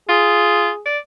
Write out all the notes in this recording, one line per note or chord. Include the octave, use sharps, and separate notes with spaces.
F4 G#4
D5